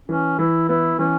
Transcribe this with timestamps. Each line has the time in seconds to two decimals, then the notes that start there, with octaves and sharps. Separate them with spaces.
0.08 E3 C#4
0.39 E3 E4
0.69 B3 E4
0.99 E3 C#4